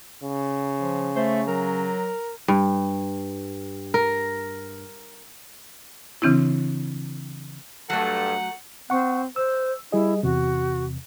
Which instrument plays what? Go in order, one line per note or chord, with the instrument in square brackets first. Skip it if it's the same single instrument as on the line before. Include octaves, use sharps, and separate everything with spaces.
[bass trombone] C#3
[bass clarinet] F3
[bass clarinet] A3 [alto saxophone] C5
[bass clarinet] F#3 [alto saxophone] A#4
[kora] G2
A#4
[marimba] C#3 E3 C4 D4 E4
[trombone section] G2 A4 [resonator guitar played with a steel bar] F#3 A3 [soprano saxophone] F#5
[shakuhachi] C4 [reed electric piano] F#5 C#6
[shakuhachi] C5 [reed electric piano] E6
[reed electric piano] G3 G#4 D#5 [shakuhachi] E4
[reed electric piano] E2 C3 [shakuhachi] F#4